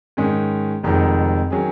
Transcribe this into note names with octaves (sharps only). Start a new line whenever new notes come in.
G#2 D#3 G#3 C#4
F1 F2 D#3 G#3 D#4
D#3 F#3 C#4 G#4